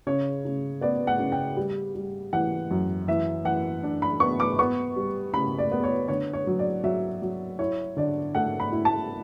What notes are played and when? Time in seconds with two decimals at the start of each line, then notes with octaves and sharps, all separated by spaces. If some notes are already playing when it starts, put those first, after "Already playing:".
0.07 C#3 C#5
0.45 C#3
0.81 B3 D5
1.07 F#5
1.19 C#3
1.32 G5
1.57 G3
1.95 G3
2.33 E3 F#5
2.71 F#2
3.08 E3 E5
3.45 E3 F#5
3.83 D4
4.02 B5
4.20 B3 C#6
4.40 D6
4.59 B3 C#6
4.96 G3
5.34 C#3 B5
5.58 D5
5.72 B3
5.83 C#5
6.08 D3 C#5
6.33 C#5
6.47 F#3
6.59 D5
6.84 F#3 E5
7.22 F#3
7.59 E4 C#5
7.97 D3 D5
8.35 A3 F#5
8.60 B5
8.72 E4
8.85 A5